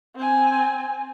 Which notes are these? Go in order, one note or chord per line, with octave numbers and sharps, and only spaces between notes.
C4 G#5